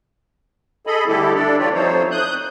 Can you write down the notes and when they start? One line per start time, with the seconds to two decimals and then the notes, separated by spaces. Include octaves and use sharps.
0.87 G#4 A4 D#5 B5
1.08 D3 G3 A3 E4 G4 A4
1.35 D4 A4 D5
1.59 E3 F4 G4 C#5 D5
1.74 F3 A3 C4 D#4 C5 C#5
2.11 D#6 F#6 G6